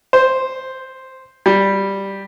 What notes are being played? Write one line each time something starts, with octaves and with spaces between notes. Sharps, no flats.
C5
G3